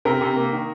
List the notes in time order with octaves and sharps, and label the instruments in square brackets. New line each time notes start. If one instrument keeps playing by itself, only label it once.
[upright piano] C3 [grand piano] A#4
[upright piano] C3
A#3
D#3